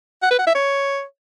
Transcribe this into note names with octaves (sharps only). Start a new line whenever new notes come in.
F#5
B4
F#5
E5
C#5